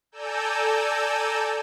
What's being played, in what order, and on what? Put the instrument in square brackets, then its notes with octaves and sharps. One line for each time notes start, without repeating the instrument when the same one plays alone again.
[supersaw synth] A4 D5 G#5 A#5 E6 G6